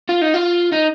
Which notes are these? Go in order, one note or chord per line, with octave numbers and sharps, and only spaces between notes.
F4
D#4
F4
D#4